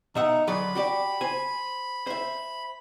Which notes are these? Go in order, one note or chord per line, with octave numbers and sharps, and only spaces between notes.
B2 D#4 E5 F#5
D2 F#3 D5 B5
F#4 G4 D5
C5 G#5
C5 E5